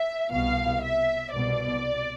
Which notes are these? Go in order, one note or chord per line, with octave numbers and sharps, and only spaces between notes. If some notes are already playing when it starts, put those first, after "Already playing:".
Already playing: E5
C2 B2 F5
E5
C2 B2 D5